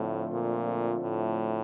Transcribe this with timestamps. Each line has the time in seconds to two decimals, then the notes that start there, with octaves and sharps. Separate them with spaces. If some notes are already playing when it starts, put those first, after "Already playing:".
Already playing: A2 D3 F3 A3 C4 F4
0.34 A#2
1.03 A2